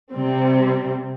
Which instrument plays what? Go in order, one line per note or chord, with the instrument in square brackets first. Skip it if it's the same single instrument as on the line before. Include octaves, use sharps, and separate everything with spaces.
[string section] C3 G3 C4